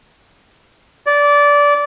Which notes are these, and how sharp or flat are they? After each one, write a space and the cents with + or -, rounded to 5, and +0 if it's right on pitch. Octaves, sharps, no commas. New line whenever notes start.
D5 -20